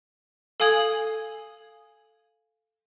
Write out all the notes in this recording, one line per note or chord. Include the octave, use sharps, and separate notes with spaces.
A4 F5 G#5 D#6 G#6 F#7